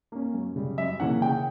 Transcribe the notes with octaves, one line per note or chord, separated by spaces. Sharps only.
A#3 C#4
F#2
C#3 G3
F#2 E5
C#3 E3 A#3 C#4 F#5
C#3 G5